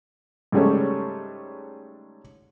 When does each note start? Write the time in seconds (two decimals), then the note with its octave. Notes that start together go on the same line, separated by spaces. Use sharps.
0.52 G#2 C#3 G3 A3 C#4